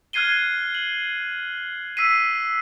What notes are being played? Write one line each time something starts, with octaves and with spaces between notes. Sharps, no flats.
F6 F#6 G#6 C7 D#7 G7
F#7
E6 B6 C7 D#7